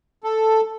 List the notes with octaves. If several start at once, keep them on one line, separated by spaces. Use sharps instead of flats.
A4